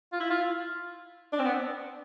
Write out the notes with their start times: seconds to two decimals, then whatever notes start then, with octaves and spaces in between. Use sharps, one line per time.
0.13 F4
0.20 E4
0.30 F4
1.33 D4
1.39 C4
1.46 B3